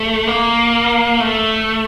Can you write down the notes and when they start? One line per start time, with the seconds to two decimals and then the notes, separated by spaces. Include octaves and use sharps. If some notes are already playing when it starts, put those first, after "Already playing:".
Already playing: A3
0.28 A#3
1.20 A3